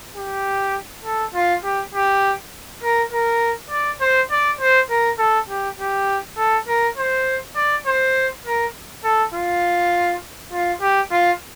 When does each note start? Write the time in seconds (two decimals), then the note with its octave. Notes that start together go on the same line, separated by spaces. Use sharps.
0.16 G4
1.04 A4
1.34 F4
1.64 G4
1.94 G4
2.83 A#4
3.11 A#4
3.71 D5
4.01 C5
4.31 D5
4.60 C5
4.90 A#4
5.19 A4
5.49 G4
5.79 G4
6.38 A4
6.67 A#4
6.97 C5
7.56 D5
7.86 C5
8.45 A#4
9.04 A4
9.34 F4
10.52 F4
10.81 G4
11.11 F4